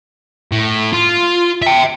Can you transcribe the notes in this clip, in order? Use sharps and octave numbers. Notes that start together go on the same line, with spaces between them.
A2
F4
E5 G5